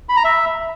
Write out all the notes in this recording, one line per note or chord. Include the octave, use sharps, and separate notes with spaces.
B5
A#5
E5